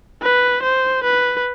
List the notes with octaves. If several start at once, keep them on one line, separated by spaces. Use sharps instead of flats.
B4
C5
B4